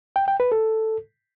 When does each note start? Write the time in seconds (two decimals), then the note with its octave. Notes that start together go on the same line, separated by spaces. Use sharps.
0.16 G5
0.28 G5
0.40 B4
0.52 A4